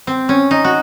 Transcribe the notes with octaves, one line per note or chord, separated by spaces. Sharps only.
C4
C#4
D#4
F#4